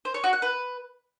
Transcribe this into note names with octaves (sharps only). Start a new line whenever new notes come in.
C5
C#5
F#4
F#5
B4